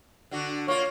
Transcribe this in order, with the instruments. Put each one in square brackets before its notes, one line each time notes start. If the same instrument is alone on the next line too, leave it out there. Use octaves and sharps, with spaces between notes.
[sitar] D3 D4 F#4
[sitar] A#3 F4 [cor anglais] C#5